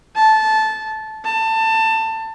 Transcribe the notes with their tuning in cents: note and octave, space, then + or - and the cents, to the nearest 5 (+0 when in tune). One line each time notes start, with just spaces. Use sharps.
A5 -15
A5 +20